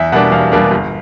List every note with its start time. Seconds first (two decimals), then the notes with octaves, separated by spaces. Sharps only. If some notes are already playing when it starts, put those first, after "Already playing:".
Already playing: E2 E5
0.12 B2 G3 A#3 D4 F#5
0.32 E2 F5
0.52 B2 G3 A#3 D4
0.71 G1